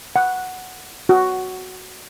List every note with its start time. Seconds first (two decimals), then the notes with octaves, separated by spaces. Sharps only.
0.16 F#5
1.09 F#4